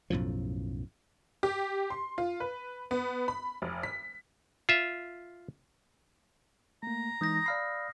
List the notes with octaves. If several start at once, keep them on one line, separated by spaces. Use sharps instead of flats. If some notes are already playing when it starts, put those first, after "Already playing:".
B1 F#2 A2 F3
G4
C6
F4
B4
B3
B5
F1
B6
F4 E5
A3 A#3 A#5
E3 G#3 D#4 D#6 G6 A#6
D5 F5 B5 E6 F6 C7